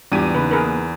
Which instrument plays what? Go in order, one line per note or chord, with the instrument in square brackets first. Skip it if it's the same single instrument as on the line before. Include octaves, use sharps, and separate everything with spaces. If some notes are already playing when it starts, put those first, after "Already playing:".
[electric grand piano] E2 D#7 [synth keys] G#2 G3 F4 [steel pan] D4 G4
[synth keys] C#3 A#3 D#4 [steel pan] B4
[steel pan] G#4 A#4 B4